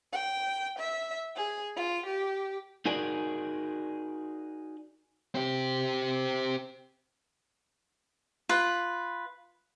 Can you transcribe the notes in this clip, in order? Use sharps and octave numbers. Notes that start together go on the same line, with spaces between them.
G5
E5
G#4
F4
G4
D#4 F#4 G#4 A#4 D5
C4 G4
F4 B4